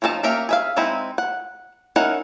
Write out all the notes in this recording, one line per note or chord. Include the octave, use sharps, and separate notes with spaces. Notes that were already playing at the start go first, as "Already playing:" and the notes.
F3 C#4 D#4 A4 A5
A#3 C#4 G4 A#4 E5
G#4 E5 F5
G#3 C4 D#4 E4
F#5
C#4 D#4 E4 A#4 F#5